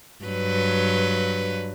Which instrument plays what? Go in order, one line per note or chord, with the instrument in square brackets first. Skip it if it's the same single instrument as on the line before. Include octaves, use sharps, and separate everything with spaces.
[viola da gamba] G2 F#3 B4